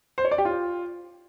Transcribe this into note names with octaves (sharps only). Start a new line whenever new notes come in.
C5
C#5
D5
G4
F4